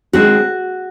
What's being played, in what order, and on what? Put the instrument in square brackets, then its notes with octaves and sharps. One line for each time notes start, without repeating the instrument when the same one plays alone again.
[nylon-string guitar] D#3 G#3 C4 F#4